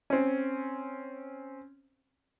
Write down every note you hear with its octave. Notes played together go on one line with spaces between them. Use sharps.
C4 C#4